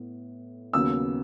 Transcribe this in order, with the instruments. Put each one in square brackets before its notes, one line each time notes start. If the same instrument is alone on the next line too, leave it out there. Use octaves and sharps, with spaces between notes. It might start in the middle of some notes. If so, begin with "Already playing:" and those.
Already playing: [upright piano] A2 B3
D#2 C#3 F#3 B3 E6